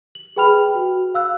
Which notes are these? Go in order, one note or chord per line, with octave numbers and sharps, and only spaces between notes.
F#7
G#4 B4 G5 B5 F6 F7
F#4
F5 E6 F#6